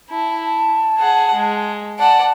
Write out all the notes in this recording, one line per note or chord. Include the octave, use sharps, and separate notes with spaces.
E4 A5
G#4 F#5
G#3
D5 F#5 A5